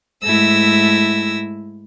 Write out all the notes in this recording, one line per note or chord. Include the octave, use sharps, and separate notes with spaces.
G#2 A3 E4 E6 A#6